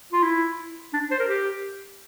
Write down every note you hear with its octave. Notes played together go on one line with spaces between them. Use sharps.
F4
E4
D4
C5
A#4
G4